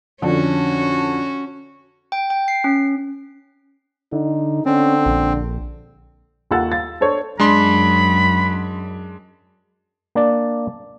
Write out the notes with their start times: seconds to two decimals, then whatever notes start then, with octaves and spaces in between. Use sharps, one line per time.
0.22 F2 D3 C#4 F#4
2.12 G5
2.30 G5
2.48 C7
2.64 C#4
4.12 D3 D#4
4.66 D3 C4 C#4
5.06 A#1
6.51 D#2 F4 A4 F#5 E6 A6
6.72 F5 A6
7.01 D4 A4 C5 C#5
7.40 F#2 G#3 D4 B5 C6
10.15 A#3 D4 D5